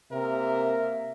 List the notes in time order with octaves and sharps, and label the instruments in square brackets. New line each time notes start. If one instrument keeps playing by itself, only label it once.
[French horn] C3 [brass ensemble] A#3 E5 [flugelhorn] A#4